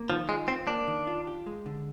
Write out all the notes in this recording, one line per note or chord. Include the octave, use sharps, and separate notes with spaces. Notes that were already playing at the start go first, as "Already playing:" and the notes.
Already playing: A#3
D#3 F3
G#3 F4
C4 C5
A#3 D4
D#3
F4
G4
G#3
D3